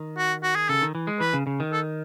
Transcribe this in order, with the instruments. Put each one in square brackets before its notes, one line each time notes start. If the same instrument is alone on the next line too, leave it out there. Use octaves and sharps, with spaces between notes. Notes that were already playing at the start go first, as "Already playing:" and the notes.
Already playing: [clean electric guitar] D#3
[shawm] F#4
F#4
G#4
[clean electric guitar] C#3 [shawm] A4
[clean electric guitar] D#3
E3
G#3
[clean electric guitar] E3 [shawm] B4
[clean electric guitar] C#3
C#3
D#3
[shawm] A4